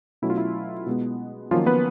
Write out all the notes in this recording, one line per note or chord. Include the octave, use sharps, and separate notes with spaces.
B2 F#3 A3 C#4 E4
F4
E4
B2 G#3 B3
D#3 F3 F#3 A#3 C#4 F4
B3 B4